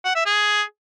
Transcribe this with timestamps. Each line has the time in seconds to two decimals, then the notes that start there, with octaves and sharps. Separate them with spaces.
0.05 F#5
0.15 E5
0.26 G#4